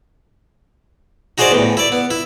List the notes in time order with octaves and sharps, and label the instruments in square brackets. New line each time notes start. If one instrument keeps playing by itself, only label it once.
[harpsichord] D#4 F#4 G#4 C5 D5
E2 A2
E4 D5
B3
E4